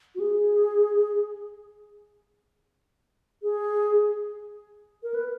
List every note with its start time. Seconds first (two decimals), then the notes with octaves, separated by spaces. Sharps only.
0.15 F#4
0.20 G#4
3.43 G#4
5.03 A#4
5.14 B4